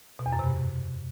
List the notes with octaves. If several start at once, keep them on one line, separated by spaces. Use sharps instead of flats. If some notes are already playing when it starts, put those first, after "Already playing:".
B2
E2
F#2
C3
G2